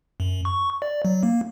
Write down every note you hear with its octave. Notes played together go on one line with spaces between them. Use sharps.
F#2
C#6
D5
F#3
A#3